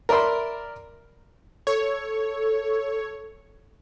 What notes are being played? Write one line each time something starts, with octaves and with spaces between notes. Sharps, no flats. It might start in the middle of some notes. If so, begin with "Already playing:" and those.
A#4 D5 E5 B5 C6
A4 C#5